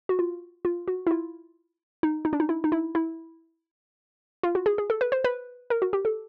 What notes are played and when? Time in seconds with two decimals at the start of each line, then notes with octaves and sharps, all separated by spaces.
0.09 F#4
0.19 F4
0.65 F4
0.88 F#4
1.07 E4
1.11 F4
2.03 D#4
2.25 D#4
2.33 D4
2.40 D#4
2.49 E4
2.64 D#4
2.72 E4
2.95 E4
4.43 F4
4.55 F#4
4.66 G#4
4.78 G#4
4.90 A4
5.01 B4
5.12 C5
5.24 B4
5.70 A#4
5.82 F#4
5.93 G4
6.05 A4